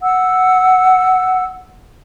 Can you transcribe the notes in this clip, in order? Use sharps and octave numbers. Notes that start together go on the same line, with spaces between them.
F#5 E6